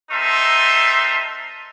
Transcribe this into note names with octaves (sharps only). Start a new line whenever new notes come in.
C4 D#4 A4 A#4 E5 C6